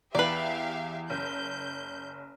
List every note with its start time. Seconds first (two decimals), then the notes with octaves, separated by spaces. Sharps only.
0.15 E2 G4 B4 D5 E5 F5
1.10 F#1 G6